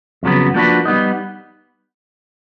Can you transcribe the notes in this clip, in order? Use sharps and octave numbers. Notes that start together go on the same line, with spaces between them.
F2 C#3 F#3 B3
F3 A#3 D4 F#4 B4
G3 B3 D#4